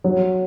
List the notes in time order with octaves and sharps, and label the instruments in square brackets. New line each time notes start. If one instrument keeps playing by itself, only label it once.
[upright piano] F#3